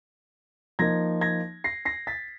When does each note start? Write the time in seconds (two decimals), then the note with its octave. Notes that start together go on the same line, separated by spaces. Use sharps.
0.79 F3 A#3 D#4 G#6 A#6
1.21 G#6 A#6
1.64 A#6 C7
1.85 A#6 C7
2.07 A6 B6